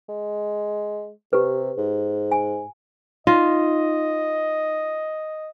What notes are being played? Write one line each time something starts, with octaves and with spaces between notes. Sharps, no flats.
G#3
C3 G4 B4
G#2
G#5
D#4 F4 D#5